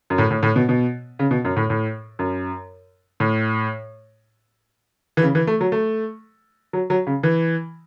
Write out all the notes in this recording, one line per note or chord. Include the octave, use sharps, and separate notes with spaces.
F#2
A2
A2
A2
B2
B2
C#3
B2
F#2
A2
A2
F#2
A2
E3
C#3
E3
A3
F#3
A3
F#3
F#3
C#3
E3